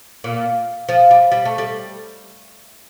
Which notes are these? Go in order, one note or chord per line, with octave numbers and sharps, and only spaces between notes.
A#2
F3
G3
G3
A3
G3